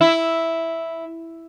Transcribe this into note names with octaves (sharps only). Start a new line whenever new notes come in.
E4